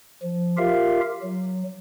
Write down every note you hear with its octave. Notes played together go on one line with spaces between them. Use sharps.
F3
F4 G4 A#4 E5 F5
F#3